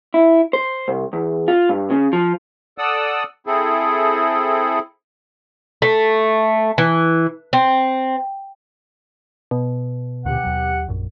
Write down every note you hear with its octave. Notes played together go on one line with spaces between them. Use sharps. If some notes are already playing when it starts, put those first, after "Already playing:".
E4
C5
C2
E2
F4
G2
C#3
F3
A4 D5 F#5 D#6 E6
C4 E4 G#4 A4
A3
E3
C4
B2
D2 A#2 D3 G4 F#5
D#2 F#3
A#1 F#2